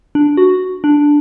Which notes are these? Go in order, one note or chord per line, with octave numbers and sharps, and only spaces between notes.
D4
F#4
D4